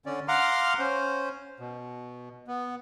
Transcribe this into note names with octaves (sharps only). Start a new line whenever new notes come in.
D3 C#4 D5
F5 F#5 A#5 C6 D6 F6
C#4 C5
B2
B3